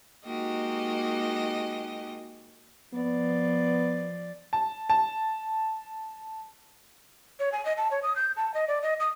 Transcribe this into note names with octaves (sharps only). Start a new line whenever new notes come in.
G#3 A#3 D#4 F#4 G4 D#5
F3 B3 D5
A5
A5
C#5
G#5
D#5
A5
C#5
D#6
G6
A5
D#5
D5
D#5
D#6